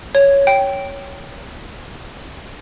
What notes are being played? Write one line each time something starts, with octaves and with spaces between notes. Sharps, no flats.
C#5
G5